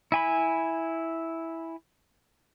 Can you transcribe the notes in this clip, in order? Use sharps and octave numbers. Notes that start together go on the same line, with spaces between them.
E4 G#5 B5